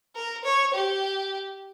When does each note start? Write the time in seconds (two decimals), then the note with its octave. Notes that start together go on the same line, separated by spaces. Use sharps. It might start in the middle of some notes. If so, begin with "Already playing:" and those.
0.15 A#4
0.44 C#5
0.74 G4